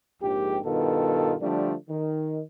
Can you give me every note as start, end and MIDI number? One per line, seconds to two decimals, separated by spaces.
0.22 0.58 34
0.22 0.58 44
0.22 0.58 67
0.64 1.35 43
0.64 1.35 47
0.64 1.35 51
0.64 1.35 59
0.64 1.35 65
0.64 1.35 69
1.41 1.73 50
1.41 1.73 53
1.41 1.73 55
1.41 1.73 57
1.41 1.73 62
1.89 2.41 51